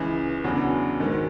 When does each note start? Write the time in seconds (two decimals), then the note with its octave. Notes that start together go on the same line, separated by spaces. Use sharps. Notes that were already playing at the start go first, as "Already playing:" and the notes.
Already playing: C#2 C#3 E3
0.44 E2 C#3 F#3 B3 D4
1.00 G#2 D#3 F#3